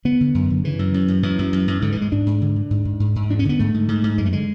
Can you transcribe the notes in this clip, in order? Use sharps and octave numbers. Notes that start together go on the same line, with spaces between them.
D3 B3
D3
F#2
D3
C#3 E3
F#2
F#2
F#2
F#2 E3
F#2
F#2
F#2
G#2 D3
E3
G#2 G#3
G#2 D4
G#2
D3
D3
G#2
G#2
G#2
G#2
E2 D4
C#4
D3 B3
G#2 A3
G#2
G#2
G#2
F#2 G#3
A3
D3 G#3